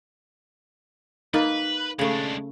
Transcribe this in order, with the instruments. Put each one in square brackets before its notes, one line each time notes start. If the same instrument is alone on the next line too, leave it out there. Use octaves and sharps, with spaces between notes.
[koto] A#3 [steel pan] D#4 [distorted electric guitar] B4
[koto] C#3 A3 [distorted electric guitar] G#3 D4